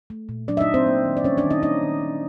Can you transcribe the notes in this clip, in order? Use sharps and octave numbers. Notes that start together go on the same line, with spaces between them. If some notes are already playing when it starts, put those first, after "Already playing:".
A3
A#2
F#3 D4 D5
E5
D#4 D#5
A#2
C4 C5
A#3
D#3
D5
G3 C#4 C#5
D4 D5
D#3
D#4 D#5
A#3 D#4 D#5
D#3
G3